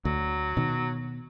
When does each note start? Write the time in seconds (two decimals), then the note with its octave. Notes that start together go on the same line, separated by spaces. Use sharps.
0.05 D2 F#3
0.57 B2 D#3